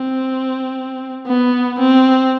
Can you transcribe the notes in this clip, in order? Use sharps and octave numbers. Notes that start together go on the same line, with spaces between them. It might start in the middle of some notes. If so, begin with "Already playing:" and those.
Already playing: C4
B3
C4